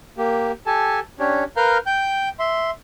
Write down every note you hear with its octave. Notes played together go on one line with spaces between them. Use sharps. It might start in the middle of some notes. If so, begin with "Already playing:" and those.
A#3 G4
G4 A4 G#5 A5
C#4 D4 G4 C#5
A#4 B4 F5 A#5 F6 G6
G5 G6
E5 C6